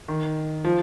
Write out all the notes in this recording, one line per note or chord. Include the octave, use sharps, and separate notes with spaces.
D#3
F3